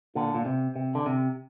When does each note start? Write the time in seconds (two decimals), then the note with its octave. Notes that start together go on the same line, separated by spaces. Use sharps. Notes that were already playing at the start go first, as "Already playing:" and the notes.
0.15 A#2 D3
0.34 A#2
0.46 C3
0.76 C3
0.95 D3
1.06 C3